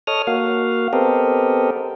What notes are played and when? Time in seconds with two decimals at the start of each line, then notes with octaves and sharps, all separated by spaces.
0.07 A4 C#5 D#5 D#6 F6
0.27 A#3 F#4 F5
0.93 B3 C4 G4 A4 A#4 D#5